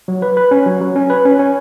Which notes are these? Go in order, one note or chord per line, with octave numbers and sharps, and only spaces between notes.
F#3
B4
B4
C#4
F#3
F#3
C#4
B4
C#4
C#4